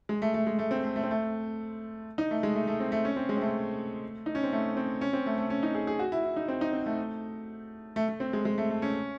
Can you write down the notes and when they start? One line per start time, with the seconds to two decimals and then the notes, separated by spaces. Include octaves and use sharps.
0.09 G#3
0.22 A3
0.34 A3
0.47 G#3
0.59 A3
0.71 C4
0.83 A3
0.96 A3
1.04 C4
1.11 A3
2.18 D#4
2.31 A3
2.43 G#3
2.55 A3
2.67 A3
2.80 C4
2.92 A3
3.05 C#4
3.16 C4
3.29 G#3
3.37 C4
3.41 A3
4.26 D#4
4.35 C#4
4.43 C4
4.52 A3
4.77 C4
5.01 C#4
5.13 C4
5.26 A3
5.38 A3
5.50 C#4
5.63 D#4
5.75 G#4
5.87 G#4
5.99 F#4
6.12 E4
6.25 E4
6.36 D#4
6.48 C4
6.61 D#4
6.73 C4
6.86 A3
7.96 A3
8.08 A3
8.20 C4
8.33 G#3
8.45 G#3
8.58 A3
8.70 A3
8.82 C#4